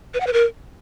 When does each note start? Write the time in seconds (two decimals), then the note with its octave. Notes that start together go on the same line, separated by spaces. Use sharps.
0.14 B4
0.20 F#5
0.27 B4
0.33 A#4